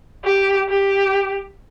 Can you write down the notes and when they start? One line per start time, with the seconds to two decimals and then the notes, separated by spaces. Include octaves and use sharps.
0.25 G4
0.69 G4